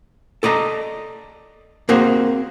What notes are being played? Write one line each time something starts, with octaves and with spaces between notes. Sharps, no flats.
A4 D5 D#5 A#5
A#3 C4 F#4 G#4 A#4 C5